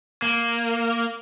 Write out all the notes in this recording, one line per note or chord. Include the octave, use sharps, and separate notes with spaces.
A#3